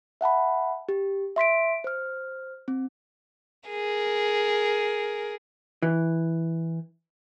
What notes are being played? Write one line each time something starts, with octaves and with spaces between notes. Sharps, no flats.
E5 F#5 A5 B5
G4
E5 C6 B6 D7
C5 F6
C4
G#4 A#4
E3